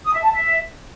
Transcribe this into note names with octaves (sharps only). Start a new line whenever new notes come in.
D#6
E5
A5
E5